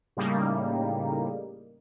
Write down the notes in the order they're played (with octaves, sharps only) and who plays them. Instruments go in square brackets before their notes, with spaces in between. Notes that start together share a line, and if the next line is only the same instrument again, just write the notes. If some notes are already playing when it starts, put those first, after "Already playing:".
[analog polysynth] A2 C#3 G3 A#3 D#4